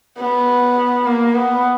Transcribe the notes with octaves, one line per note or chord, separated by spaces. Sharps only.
B3
A#3
B3